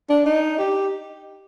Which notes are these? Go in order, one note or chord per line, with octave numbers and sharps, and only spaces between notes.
D4
D#4
G4